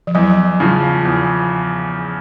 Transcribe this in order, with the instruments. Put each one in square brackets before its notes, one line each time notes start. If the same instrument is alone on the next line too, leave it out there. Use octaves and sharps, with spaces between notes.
[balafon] F3
[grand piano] E2 [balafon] F#3
[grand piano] C#3 F3
E2